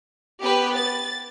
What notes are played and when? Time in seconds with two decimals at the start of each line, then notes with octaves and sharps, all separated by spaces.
0.42 B3 G4 B4
0.73 A6